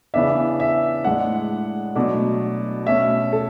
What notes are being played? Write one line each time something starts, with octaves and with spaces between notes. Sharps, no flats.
C#3 E3 B3 D4 E5
E5
A2 G#3 D4 F#5
B2 F#3 A3 D4
B2 A3 C#4 E5
A4